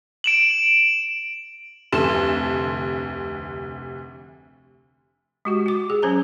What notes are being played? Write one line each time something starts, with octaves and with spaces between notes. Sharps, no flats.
D7 E7 F#7
F1 D2 C3 A4 C6 E7
G#3 F#4 G4
F#4 D6
G#4
F#3 C#4 C5 A#5